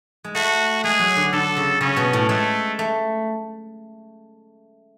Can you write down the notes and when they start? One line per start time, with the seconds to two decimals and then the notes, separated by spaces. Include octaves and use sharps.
0.24 G#3
0.35 A3 F#4
0.84 G#3 G#4
0.99 F#3
1.16 D3
1.32 D3 A4
1.57 C#3
1.81 C#3 C#4
1.97 B2
2.13 A2
2.29 G#3 A3
2.79 A3